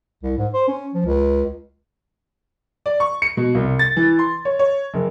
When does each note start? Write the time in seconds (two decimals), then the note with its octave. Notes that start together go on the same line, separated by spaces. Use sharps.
0.23 C2
0.38 G#2
0.54 C5
0.68 C#4
0.94 F3
1.06 C#2
2.86 D5
3.00 C#6
3.22 C#7
3.37 B2
3.55 C2
3.79 A6
3.96 E3
4.19 C6
4.45 C#5
4.59 C#5
4.94 F#1